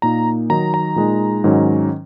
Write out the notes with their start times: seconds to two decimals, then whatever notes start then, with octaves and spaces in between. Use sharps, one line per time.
0.02 A#2 A#3 D#4 A#5
0.50 D#3 F#3 D#4 A#5
0.74 A#5
0.96 A#2 G#3 D#4
1.44 G#2 D#3 F#3 C#4